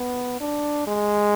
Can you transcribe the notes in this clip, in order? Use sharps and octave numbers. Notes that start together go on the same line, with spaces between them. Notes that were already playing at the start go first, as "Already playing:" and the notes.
Already playing: B3
D4
G#3